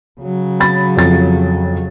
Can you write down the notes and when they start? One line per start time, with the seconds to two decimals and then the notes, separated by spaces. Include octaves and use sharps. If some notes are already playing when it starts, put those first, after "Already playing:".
0.21 C#3 F#3
0.60 B5 A6
0.97 F2 A6